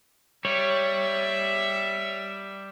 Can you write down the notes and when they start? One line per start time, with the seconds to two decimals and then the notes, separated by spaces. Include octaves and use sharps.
0.45 G3 C#5 E5